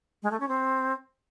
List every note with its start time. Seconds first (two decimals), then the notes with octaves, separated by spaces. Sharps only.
0.23 G#3
0.31 A3
0.40 C#4
0.48 C4